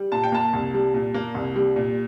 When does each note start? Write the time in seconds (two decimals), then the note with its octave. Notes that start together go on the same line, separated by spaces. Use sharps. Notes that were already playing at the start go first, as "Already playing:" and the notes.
Already playing: G3
0.12 A#2 A5
0.24 G5
0.32 A#3 A5
0.53 C2
0.74 G3
0.94 A#2
1.14 A#3
1.34 C2
1.56 G3
1.76 A#2